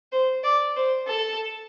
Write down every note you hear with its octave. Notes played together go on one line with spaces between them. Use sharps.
C5
D5
C5
A4